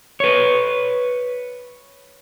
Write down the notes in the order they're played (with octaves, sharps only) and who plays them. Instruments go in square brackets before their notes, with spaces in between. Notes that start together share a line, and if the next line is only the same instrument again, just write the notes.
[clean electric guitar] B4 C#5